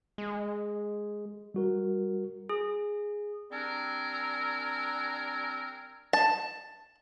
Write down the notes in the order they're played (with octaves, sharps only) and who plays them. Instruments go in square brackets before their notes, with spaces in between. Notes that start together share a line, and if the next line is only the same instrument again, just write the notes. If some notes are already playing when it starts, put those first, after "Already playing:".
[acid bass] G#3
[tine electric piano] G3 F#4 A#4
[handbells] G#4
[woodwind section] G3 C4 D4 A#4 G#5 E6
[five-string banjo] A5